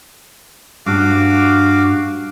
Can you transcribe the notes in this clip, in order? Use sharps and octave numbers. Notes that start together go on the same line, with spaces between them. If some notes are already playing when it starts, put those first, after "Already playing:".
G2 F#4 F5 D6